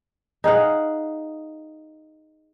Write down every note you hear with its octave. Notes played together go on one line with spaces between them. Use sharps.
D#4 G#4 F5 F#5